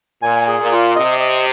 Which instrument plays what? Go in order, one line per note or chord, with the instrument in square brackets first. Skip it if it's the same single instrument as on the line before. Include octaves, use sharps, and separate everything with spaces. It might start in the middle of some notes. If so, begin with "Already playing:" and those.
[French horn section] A#2 [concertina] G#5
[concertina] G#4
[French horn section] A#2
[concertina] F4
[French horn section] C3 [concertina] D#5
[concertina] D#5